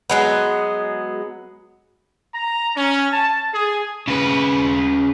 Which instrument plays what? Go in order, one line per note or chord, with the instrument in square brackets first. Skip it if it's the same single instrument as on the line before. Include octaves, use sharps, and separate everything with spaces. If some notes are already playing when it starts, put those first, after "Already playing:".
[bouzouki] F#3 G#3 B3
[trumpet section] A#5
C#4
A5
G#4
[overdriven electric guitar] C#3 B4